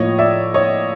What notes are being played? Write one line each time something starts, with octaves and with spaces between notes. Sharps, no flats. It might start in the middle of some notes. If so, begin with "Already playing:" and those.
Already playing: A2 F3 A#3 C#5 D#5
D5 E5
C#5 D#5